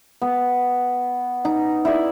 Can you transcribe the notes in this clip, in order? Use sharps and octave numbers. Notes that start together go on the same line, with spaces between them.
B3
D#4
E4 D5